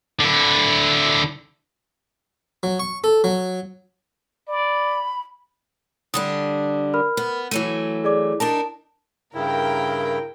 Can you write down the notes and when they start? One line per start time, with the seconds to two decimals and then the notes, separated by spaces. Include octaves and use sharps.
0.20 D3 E4
2.63 F#3
2.79 C#6
3.04 A4
3.24 F#3
4.48 D5 B5
6.14 D3 G3 D4 D#6
6.94 A#4 B5 F6
7.17 B3
7.51 E3 F#3 A3 D#7
8.04 G#4 D5 D6
8.40 D4 D#4 A#4 A5
9.34 G2 C#3 E4 A#4 G5